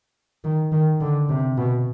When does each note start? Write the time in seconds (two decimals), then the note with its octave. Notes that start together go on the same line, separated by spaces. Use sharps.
0.44 D#3
0.72 D#3
1.01 D3
1.29 C3
1.57 B2